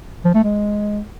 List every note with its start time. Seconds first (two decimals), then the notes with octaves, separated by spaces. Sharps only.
0.25 F3
0.34 A3
0.44 G#3